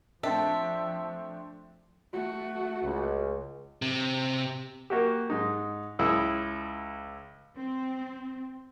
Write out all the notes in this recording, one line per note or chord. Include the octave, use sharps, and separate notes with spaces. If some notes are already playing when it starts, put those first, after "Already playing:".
F3 A3 C4 D4 E5 A5
A3 F#4
C#2
C3
A#3 F#4 G4
G#2 D#4
C#2 E4 D#6
C4